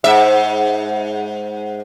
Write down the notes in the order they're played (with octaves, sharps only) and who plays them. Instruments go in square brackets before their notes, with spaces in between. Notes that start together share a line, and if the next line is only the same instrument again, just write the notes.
[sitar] G#2 E5